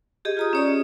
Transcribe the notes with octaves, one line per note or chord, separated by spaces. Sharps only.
G4 G#4 D#5
F4 A#5 D#6
C#4 C#5 D5
D#5